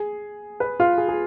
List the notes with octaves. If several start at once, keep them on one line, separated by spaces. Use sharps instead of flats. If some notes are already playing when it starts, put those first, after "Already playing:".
Already playing: G#4
B4
F4
G#4
G#4